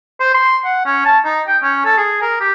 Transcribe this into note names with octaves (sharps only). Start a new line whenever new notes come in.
C5
C6
F#5
C#4
A5
D#4
G5
C#4
A4
G#4
A#4
G4